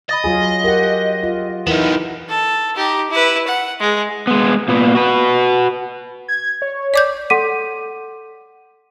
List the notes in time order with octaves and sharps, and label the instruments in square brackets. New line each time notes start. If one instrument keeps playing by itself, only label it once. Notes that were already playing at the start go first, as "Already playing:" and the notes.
[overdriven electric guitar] D#5 [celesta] B5 D#6 A6
[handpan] F#3 F4 G#4 [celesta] G#5
[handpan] G4 F#5 [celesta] A#4
[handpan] F4
[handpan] E3 E4 A#4 [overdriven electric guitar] B3 D#4 [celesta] E7
[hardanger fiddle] A4
D#4 G4
E4 B4
F#5
G#3
[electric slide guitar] G#3 B3
A#2 B3
F#4 B4
[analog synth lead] G#6
C#5
[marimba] D5 D6 G6
[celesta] A4 F#5 C6 D6 B6 D#7